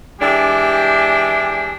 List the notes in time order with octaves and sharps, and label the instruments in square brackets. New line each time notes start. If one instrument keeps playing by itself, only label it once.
[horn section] E3 G#3 D4 G4